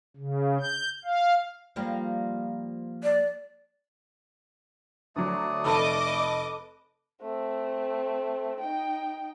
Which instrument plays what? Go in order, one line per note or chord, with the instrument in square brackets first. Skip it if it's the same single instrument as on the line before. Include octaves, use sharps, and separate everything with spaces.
[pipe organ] C#3
G6
F5
[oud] F3 G3 A#3
[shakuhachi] D5
[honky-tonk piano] D2 F#3 [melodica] A3 D5 D#6
[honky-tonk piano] F1 [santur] A4 B4 A5 [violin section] D#5 D6
[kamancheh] A3 C4
D#4 G5